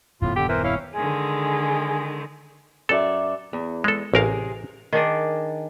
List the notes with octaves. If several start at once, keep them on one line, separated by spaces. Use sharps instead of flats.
D#1 F#2 A2 B3 F4
D3 G4
E3 A#4 C5
C#4 E4 F5
D3 D#3 G#3 G#4
F#2 A4 D5 E5
E2
G#3 A4
A1 C3 G#4 A#4 F5
D#3 D4 G#4 D5